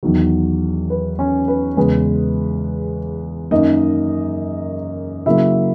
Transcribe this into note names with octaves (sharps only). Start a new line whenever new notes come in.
E2 D#3 F#3
B4
C#4 C#5
B4
E2 C#3 G#3 B4
F#2 D#3 A#3 D#4 D#5
C#3 F#3 A#3 E4 E5